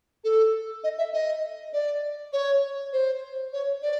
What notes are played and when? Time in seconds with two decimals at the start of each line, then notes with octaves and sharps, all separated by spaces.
0.24 A4
0.84 D#5
0.98 E5
1.13 D#5
1.73 D5
2.33 C#5
2.93 C5
3.53 C#5
3.82 D5